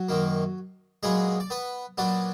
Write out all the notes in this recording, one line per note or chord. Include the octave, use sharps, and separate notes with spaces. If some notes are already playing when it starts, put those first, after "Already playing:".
Already playing: F#3 F#4
F#2 D#3 A#3
A#2 F#3 G#3 B3 G#4
D5
B3 B4
A#2 F#3 B3 D4 D5